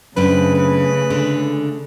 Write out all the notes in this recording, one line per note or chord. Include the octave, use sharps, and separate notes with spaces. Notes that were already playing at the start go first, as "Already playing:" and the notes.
F#2 C#3 A3 C4 D4 B4
B4
D3